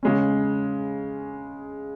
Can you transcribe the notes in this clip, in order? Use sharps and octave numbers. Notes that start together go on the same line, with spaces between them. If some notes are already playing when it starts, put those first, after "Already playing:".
C#3 G#3 C#4